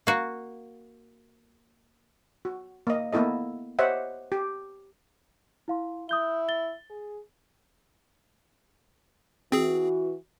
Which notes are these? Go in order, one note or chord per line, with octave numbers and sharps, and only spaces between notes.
A#3 F#4
F#4
A#3 D#5
A#3 B3 E4 A4 D#5
G4 C5 C#5 D#5 E5 F#5
G4
E4 F5 C6
E4 D#6 G6 G7
A6 G7
G#4
E3 C4 F#4 G#4